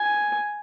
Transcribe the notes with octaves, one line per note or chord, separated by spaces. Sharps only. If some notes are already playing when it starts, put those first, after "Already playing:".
Already playing: G#5